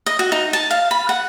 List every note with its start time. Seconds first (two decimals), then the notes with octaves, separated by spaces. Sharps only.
0.06 D#5
0.19 F#4
0.32 D#4
0.53 A5
0.71 F5
0.91 B5
1.09 F#5